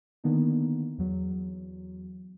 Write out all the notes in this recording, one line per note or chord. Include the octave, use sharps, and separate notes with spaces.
D3 D#3 A#3 B3 D4 D#4
E2 F#3